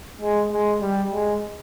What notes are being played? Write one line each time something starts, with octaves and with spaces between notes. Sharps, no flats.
G#3
G#3
G3
G#3